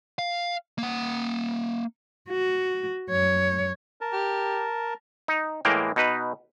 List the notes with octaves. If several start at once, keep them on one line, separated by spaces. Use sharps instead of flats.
F5
A#3 F#5
F#4
F#2 C#5
A#4 A5
G4
D#4
A2 E3 G#3 A#3 A#4 G5
B2 D#4 B4